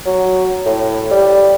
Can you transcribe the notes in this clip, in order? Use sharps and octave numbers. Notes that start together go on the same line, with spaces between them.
F#3
A2
G3